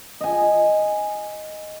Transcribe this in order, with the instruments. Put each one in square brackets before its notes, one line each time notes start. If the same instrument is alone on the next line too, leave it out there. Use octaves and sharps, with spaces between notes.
[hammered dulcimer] D#5 G#5